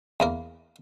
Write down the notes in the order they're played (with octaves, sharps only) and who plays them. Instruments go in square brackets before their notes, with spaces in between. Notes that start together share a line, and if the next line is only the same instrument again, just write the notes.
[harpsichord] E2 A#3 A#4